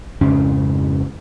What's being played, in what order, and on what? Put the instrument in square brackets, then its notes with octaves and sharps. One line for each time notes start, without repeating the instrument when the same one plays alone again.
[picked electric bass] F2 G#2 C#3 C#4